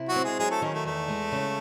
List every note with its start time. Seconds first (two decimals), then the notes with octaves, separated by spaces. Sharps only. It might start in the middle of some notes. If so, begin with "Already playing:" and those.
Already playing: C3 E4
0.08 F#3 F#4
0.16 C4
0.24 G#3 G#4
0.39 F#3 G#3 G#4
0.50 A3 A4
0.62 D#3 C#4
0.74 A3
0.85 E2 A3
1.08 G#3
1.32 C#3